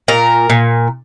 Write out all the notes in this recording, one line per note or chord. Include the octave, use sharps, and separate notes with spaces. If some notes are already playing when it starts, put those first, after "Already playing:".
A#2 A#4
A#2